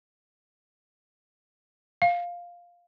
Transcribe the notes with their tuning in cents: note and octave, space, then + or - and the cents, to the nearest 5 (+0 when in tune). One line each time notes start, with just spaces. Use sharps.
F5 +5